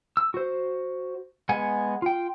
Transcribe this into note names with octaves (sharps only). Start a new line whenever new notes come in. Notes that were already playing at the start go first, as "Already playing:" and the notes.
E6
F#4 C5
G#3 B3 F#5 G#5
F4 G5